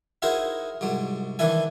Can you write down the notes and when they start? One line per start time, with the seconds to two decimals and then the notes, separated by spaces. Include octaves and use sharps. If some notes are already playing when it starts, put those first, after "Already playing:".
0.22 D#4 E4 F#4 G#4 A#4 C5
0.81 C2 G#2 F#3
1.39 D#3 E3 D4 E4 G#5